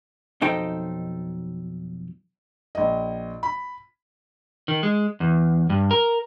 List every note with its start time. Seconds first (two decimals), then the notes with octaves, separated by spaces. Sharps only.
0.41 B1 F2 D#4 A4 C5 G5
2.75 A#1 D#5
3.43 B5
4.68 D#3
4.83 G#3
5.20 E2
5.70 G2
5.91 A#4